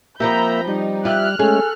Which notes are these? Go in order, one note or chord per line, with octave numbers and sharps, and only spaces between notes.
F3 A#3 C4 G4 E5 A#5 B5 G6
G3 D#4
F4 G4 E5 F6 F#6
G#3 A3 C#4 G#4 A4